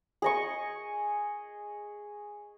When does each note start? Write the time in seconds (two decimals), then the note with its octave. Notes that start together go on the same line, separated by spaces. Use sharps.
0.22 G#4 D#5 C#6